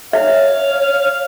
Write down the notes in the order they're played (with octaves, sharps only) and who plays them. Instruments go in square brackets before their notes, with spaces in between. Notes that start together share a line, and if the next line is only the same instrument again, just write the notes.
[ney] C#5 [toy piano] E5 [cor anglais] F5